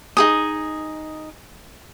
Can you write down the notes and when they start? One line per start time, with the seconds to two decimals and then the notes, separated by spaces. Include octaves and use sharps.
0.17 D#4 G#4 D#6